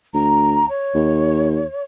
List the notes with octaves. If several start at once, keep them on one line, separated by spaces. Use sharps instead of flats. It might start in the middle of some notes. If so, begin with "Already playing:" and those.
D2 A#5
C#5
D#2